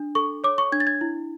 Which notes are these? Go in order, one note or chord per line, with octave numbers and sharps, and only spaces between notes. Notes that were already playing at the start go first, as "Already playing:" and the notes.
Already playing: D4
A4 C#6
C#5 D6
C#6
D4 G#6
A6
G#6
E4